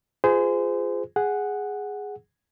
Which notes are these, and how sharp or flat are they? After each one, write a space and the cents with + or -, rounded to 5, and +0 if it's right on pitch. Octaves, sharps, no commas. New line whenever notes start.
F4 +0 G#4 +0 C5 -30
G#4 +0 F#5 +0